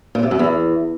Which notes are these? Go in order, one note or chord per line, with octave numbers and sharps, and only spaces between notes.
A#2
C3
F#2
E2